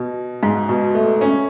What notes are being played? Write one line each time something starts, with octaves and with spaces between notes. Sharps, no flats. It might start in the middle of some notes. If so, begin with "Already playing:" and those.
Already playing: B2
G#2
B2
A3
C#4